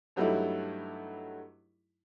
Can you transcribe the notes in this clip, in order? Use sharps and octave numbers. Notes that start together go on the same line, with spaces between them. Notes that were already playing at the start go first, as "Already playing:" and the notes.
G2 F#3 G3 A3 D#4 E4